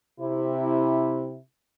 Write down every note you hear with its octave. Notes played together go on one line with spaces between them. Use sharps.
C3 E4